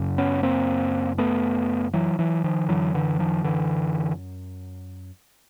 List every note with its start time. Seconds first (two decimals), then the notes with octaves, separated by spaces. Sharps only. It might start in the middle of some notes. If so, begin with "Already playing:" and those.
Already playing: F#2 C#3
0.18 B3 C#4
0.43 A#3 C4
1.18 A3 B3
1.94 E3 F#3
2.19 E3 F#3
2.44 D#3 F3
2.69 F#2 D3 E3 F#3
2.94 D3 E3
3.19 D#3 F3
3.44 D3 E3